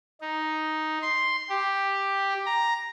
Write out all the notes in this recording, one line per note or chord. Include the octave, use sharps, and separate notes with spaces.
D#4
C6
G4
A#5